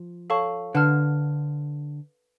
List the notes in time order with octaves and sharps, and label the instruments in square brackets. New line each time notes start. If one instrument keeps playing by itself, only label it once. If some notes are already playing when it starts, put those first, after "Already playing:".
Already playing: [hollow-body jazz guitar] F3
[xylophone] A4 C#5 F5 A5 C#6
[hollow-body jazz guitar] D3 [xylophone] B4 F#5 A5 F6